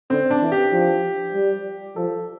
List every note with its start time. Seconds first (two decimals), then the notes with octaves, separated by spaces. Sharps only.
0.10 D3 C4
0.31 D4
0.41 E3
0.52 G4
0.72 F3
1.34 G3
1.96 F3 A4